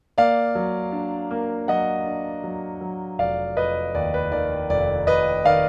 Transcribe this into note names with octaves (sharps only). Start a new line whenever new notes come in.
A#3 D5 F5
F#3
D4
A#3
F#3 D#5 F#5
D4
F#3
F#3
F1 D5 F5
F1 B4 D#5
D#2 D5
B4
D#3 D5
F1 D5
F1 B4 D#5
D#3 D5 F5